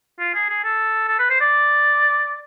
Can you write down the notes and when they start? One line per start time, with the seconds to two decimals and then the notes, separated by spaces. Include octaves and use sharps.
0.20 F4
0.34 G#4
0.49 G#4
0.64 A4
1.08 A4
1.19 B4
1.30 C5
1.41 D5